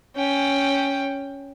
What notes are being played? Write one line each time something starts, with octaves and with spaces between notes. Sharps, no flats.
C#4 G5